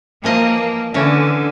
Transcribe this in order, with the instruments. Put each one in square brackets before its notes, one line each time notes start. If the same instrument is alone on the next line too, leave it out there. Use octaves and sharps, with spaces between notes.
[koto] E3 F3 D#5 [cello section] A#3
[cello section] D3 [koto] E3 C#4